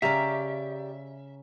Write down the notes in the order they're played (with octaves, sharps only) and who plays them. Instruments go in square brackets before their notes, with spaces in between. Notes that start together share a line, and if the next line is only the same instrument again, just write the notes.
[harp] C#3 F5 A#5 [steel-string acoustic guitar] G4 D5 [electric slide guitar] E5